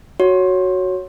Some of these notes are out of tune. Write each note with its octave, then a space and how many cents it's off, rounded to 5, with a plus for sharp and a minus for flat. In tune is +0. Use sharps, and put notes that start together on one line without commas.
F#4 +0 C#5 +0